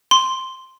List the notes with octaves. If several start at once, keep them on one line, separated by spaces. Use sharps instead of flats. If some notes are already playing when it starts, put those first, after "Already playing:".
C6